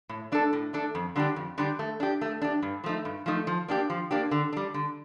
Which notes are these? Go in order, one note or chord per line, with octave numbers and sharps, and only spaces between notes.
A2
A3 D4 A4
A2
A3 D4 A4
F2
D3 G3 D4 G4
F2
D3 G3 D4 G4
A3
D4 G4
A3
D4 G4
G2
F3 A3 D#4
G2
F3 A3 D#4
F3
A#3 D4 G4
F3
A#3 D4 G4
D3
G3 D4
D3